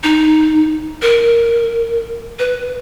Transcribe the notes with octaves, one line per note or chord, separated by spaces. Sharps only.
D#4
A#4
B4